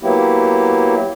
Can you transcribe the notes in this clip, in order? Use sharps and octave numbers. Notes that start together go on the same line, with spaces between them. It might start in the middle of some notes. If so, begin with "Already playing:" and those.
F#3 A#3 B3 E4 G4